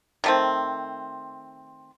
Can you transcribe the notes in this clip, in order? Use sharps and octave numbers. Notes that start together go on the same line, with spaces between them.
D#3 A3 C4